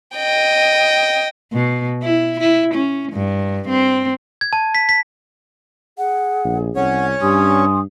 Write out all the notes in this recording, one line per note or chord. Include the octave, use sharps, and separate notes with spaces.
D#5 G5
B2
E4
E4
C#4
G2
C4
G#6
A5
B6
B6
G#4 F#5
A#1
C2 C#4 C#5 F#5
G2 G4 G#5 C6 D#6